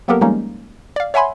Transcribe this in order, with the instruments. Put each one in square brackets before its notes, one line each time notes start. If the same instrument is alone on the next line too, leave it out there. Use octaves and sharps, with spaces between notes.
[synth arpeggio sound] F#3 A#3 B3 G4 A4 A#4
F3 G3 G#3 A#3 C#4 D#4
D5 F5
C#5 E5 F#5 G#5 B5 C6